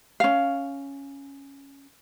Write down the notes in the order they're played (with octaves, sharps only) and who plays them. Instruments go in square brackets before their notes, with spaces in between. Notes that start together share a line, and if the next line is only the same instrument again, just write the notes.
[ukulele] C#4 F5